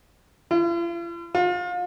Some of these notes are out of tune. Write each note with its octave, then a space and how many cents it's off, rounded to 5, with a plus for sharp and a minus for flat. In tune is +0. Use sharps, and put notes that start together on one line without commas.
F4 -45
F4 +35